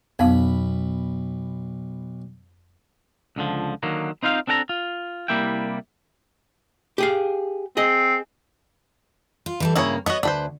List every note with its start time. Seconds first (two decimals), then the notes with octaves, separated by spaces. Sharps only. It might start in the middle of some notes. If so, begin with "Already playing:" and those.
0.19 B1 F2 B3 F5 B5
3.36 C#2 D3 F3
3.83 D3 D#3 F#3 A#3
4.23 C4 D#4 F4 C5 F5
4.47 C4 D4 A4 F#5 A#5
4.69 F4
5.28 C2 G3 A#3 E4 E5 G5
6.98 G4 G#4 F5
7.77 C4 G#4 D#5
9.46 F4
9.60 E3 G3 A4
9.76 G2 C#3 A#3 E4 G#4 C#5
10.06 B3 F#4 C#5 D#5
10.23 D2 D4 B4 C5